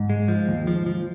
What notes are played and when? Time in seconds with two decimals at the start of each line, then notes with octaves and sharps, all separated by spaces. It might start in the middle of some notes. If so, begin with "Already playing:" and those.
Already playing: G#2
0.10 G#3
0.28 F3
0.48 D#2
0.67 F3
0.86 F3